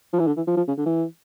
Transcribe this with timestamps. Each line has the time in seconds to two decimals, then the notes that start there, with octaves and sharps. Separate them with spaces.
0.13 F3
0.19 E3
0.27 D3
0.37 E3
0.47 F3
0.57 F3
0.67 C#3
0.77 D3
0.86 E3